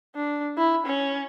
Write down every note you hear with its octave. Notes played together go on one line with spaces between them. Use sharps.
D4
E4
C#4